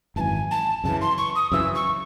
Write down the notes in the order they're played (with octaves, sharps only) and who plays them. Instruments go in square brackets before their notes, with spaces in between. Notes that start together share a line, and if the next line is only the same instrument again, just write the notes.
[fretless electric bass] G#1 F#2 E3 [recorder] G#5 A5
[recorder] A5
[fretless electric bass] F#2 C#3 E3 [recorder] A5
[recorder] C6
C#6
D#6
[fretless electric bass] F#2 C#3 E3 [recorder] E6
[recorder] C#6